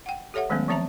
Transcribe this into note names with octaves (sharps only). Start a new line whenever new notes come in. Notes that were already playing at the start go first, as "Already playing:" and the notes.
F#5 G5
G4 A4 C#5 E5 F#5
D#3 F#3 G#3 A3 B3 C#4
E3 F3 C4 E5 A5 A#5